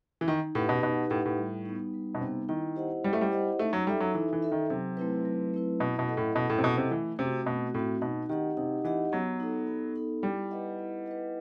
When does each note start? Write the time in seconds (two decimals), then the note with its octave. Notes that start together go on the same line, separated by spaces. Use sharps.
0.21 E3
0.28 D#3 D#4
0.55 A2 G4 B4 F#5
0.69 B2
0.83 B2 D#4
1.10 A2 G4 B4 F#5
1.25 A2
1.38 G3
1.65 B3 D#4
1.94 G3
2.15 B2
2.21 C3 B3 D#4
2.49 D#3 E4
2.76 G4 C5 D#5 F#5
3.04 G3 E4
3.13 A3
3.21 G3
3.31 G4 C5 D#5 F#5
3.59 A3 D#4
3.73 F#3
3.87 G3 A4 E5
4.00 F#3
4.14 E3 D#4
4.33 E3
4.42 A4 E5
4.52 D#3
4.70 C3 F#3
4.97 A3 C4 E4 B4
5.25 F#3
5.53 A3 C4 E4 B4
5.80 B2 E4
5.99 B2
6.08 A4 D#5 F#5
6.17 A2
6.35 B2 E4
6.50 A2
6.58 C3
6.63 B2 A4 D#5 F#5
6.77 C3
6.91 E3 A3
7.18 C3 C4 F#4
7.46 B2 A3
7.74 A2 C4 F#4
8.02 B2 D#4
8.29 D#3 G4 D#5 F#5
8.57 C3 D#4
8.84 E3 G4 D#5 F#5
9.12 F#3 B3
9.40 D#4 A4
9.67 B3
9.96 D#4 A4
10.22 G3 E4
10.51 B4 D#5 F#5
10.79 E4
11.06 B4 D#5 F#5